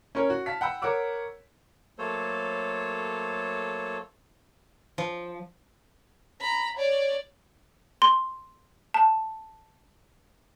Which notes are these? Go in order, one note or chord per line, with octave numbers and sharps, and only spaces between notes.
C#4 A#4 C#5
F#4
F5 A5 B6
F#5 G5 B5 E6
A#4 C#5 F#5 D6 E6
F#3 A3 A#3 A4 C5 C#5
F3
A#5 B5
C#5 D5
C6
A5